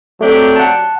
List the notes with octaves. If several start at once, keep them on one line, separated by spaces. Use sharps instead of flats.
F#3 A3 C4 D4 G4
F#5 A5